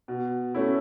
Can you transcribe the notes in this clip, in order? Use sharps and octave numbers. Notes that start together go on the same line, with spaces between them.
B2
A3 C#4 E4